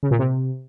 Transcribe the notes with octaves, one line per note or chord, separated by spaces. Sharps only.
C#3
A#2
C3